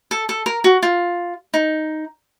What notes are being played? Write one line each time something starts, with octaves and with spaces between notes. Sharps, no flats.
A4
A4
A#4
F#4
F4
D#4